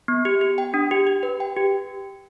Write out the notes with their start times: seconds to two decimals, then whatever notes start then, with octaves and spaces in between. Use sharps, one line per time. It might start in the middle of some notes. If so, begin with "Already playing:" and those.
0.08 B3
0.25 G4
0.41 G4
0.58 G5
0.74 D4
0.91 G4
1.07 G4
1.23 B4
1.40 G5
1.57 G4